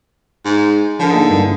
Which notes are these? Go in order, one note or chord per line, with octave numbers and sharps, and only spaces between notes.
G#2
D3 F3 A#4
A#3 D#4 G#4
G2 E4